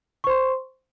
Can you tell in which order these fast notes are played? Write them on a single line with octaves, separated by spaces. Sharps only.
C#6 C5 C6